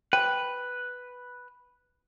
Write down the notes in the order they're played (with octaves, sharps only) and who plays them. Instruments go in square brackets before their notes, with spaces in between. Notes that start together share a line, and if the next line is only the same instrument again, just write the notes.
[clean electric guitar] B4 [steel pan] G5